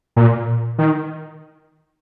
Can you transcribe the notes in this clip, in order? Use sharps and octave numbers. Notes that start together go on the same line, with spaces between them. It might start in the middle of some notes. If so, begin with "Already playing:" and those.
A#2
D#3